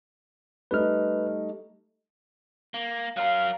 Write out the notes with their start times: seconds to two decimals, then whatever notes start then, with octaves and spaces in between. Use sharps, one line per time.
0.71 G3 A3 D#4 B4 F6
2.74 A#3
3.17 F#3 A#4 F5